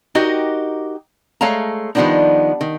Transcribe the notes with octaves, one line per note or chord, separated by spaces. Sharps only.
D#4 F#4 G4 A#4 D#5
G#3 A3 C#5 F5 A5 A#5
D#3 F3 G3 B3 D4 D#4
D#3